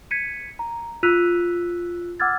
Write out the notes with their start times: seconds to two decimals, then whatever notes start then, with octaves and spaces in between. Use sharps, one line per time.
0.11 G#6 B6 C#7 D#7
0.59 A#5
1.03 F4 E6 F#6 B6 D#7 F7
2.20 F#5 D6 E6 F6 G#6 A6